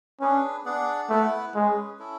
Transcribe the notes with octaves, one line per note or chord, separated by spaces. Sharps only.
C#4 D4 G#4 B4
B3 D4 G#4 D5 F#5
A3 B3 E4 B4 F#5
G#3 C#4 G#4 B4
C#4 E4 A4